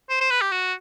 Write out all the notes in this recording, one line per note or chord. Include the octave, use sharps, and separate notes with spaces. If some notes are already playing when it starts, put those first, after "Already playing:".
C5
C5
B4
G4
F#4